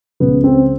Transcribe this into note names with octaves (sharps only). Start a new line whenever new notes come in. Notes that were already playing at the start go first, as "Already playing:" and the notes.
C#2 C#3 F3 B3
C4